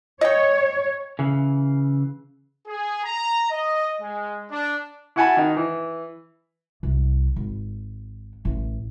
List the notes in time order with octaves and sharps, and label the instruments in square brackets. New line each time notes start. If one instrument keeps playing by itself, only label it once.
[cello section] C#5 [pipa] D#5 G5
[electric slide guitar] C#3 E3
[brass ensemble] G#4
A#5
D#5
G#3
D4
[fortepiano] E4 F#4 F#5 G#5 A5 B5
D#3 D#4
E3
[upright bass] C2
G#1
A1